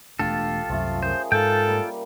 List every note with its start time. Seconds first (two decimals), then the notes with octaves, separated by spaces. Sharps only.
0.19 E1 A3 D4 F4 G4 A4
0.69 C2 F#2 F3 A3
1.03 C#4 G#4 A#4 C5
1.32 G#2 F4 A4 G5
1.67 G3 A#3